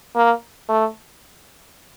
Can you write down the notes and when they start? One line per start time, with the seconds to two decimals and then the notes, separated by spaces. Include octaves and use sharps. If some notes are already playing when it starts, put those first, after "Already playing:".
0.16 A#3
0.69 A3